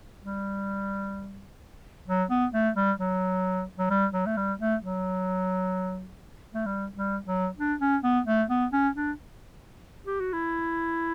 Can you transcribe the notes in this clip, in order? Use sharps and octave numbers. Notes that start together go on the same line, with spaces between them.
G3
F#3
B3
A3
G3
F#3
F#3
G3
F#3
A3
G3
A3
F#3
A3
G3
G3
F#3
D4
C#4
B3
A3
B3
C#4
D4
G4
F#4
E4